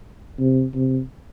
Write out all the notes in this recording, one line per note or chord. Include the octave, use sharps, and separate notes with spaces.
C3
C3